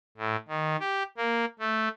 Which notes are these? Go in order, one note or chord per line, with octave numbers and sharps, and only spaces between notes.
A2
D#3
G4
A#3
A3